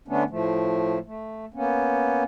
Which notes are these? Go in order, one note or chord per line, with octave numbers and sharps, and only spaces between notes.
D3 A3 B3 C#4 D4
A2 F3 A3
A3
A#3 B3 C#4